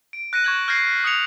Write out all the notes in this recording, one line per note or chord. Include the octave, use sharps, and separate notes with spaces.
D7
F#6 A#6 C#7 D#7
C#6 G#6 F#7
F6 G6 G#6 A#6 C7
B6
D#6 F6 G#6 C#7 F7